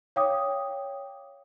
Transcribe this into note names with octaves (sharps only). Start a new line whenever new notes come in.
C#5 F5 G5 D6 D#6